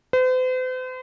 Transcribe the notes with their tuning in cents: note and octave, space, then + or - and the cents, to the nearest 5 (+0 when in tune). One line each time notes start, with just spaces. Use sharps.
C5 -45